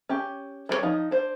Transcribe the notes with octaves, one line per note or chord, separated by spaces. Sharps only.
C#4 G4
G3 D4 C#5
F3 D#4
D4 C5